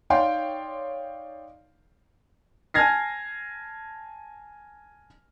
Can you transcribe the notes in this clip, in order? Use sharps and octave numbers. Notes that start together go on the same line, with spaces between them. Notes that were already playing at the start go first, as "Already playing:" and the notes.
D#4 C#5 D5 F5 G5 C6
G#5 A5 F6 G#6 A#6 C7